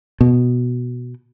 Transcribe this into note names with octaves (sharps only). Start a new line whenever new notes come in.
B2